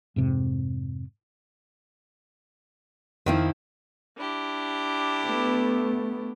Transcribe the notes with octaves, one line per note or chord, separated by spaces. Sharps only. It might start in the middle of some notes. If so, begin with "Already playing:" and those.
F2 G#2 C3
F2 D#3 F3 E4
D4 E4 G4
A3 B3